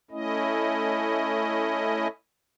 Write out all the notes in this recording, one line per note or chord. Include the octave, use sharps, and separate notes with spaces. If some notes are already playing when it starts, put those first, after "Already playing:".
A3 C#4 E4 D#5